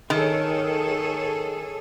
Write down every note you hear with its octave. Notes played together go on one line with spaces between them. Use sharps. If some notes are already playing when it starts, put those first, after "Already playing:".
D#3 G#4 A4 C#5